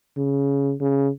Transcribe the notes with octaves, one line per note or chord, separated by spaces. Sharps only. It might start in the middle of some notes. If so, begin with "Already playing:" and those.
C#3
C#3